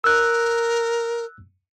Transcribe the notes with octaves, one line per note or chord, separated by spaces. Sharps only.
A#4 E6 F#6